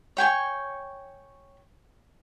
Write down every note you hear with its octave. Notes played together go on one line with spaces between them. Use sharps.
C#5 G5 G#5 C#6